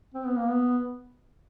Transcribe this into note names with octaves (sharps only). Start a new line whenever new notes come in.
C4
B3
A#3
B3